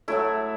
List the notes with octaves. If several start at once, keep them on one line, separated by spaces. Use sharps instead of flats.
A2 F#3 A3 E4